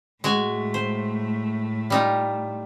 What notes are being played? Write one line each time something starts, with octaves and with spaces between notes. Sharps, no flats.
A2 G#3 A3 F#4 G#5
C5
G3 D#4 F4